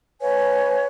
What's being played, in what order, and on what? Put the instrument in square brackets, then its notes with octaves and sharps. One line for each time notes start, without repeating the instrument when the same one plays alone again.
[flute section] B4 C#5 F5 G#5